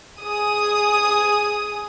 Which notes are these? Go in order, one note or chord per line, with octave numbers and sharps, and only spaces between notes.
G#4 D#6